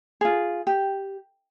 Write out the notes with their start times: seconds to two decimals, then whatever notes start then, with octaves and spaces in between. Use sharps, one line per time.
0.21 F4 G#4
0.67 G4